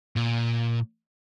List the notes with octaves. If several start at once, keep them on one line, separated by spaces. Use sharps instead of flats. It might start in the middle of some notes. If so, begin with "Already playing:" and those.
A#2